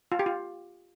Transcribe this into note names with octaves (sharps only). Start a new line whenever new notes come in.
F4
G4
F4